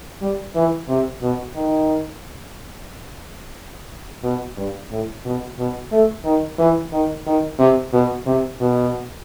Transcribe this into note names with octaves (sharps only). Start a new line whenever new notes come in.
G3
E3
C3
B2
D#3
B2
G2
A2
B2
B2
A3
D#3
E3
D#3
D#3
C3
B2
C3
B2